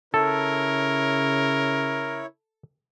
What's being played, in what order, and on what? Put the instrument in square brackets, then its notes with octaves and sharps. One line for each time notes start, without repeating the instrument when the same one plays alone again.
[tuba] C#3 [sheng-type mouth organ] E4 C#5 [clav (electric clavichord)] A4 [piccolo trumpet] A#4